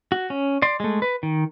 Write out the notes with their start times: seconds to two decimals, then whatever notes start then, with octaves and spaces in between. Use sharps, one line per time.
0.12 F#4
0.30 C#4
0.62 D5 C6
0.80 G#3 A3
1.02 B4
1.23 D#3